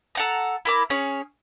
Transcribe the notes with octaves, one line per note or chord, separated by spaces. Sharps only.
A4 F#5 A#5
E4 A#4 D6
C#4 G#4 C#5 F6